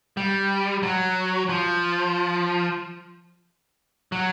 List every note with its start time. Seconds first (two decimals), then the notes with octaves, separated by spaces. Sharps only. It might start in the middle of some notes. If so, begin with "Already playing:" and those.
0.17 G3
0.83 F#3
1.49 F3
4.12 F#3